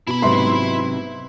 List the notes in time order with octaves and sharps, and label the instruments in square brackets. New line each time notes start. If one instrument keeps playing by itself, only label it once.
[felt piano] B2 [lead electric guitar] E4 B5
[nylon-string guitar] G#2 C3 F#3 [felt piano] B3 D#4 E5 [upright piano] C6